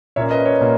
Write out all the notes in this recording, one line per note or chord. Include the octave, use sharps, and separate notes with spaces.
A#2 A#3 C#4 C#5 E5
B4 D#5
C#5
A#2 A#3